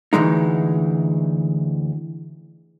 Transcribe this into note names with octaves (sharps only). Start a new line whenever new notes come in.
D2 E3 G#3 D#4